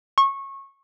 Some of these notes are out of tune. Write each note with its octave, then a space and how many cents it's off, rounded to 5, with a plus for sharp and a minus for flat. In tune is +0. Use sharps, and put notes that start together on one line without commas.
C#6 -20